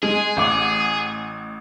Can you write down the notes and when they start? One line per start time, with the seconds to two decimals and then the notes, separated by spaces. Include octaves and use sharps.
0.03 G#3 G#4
0.37 A1 F#5 D6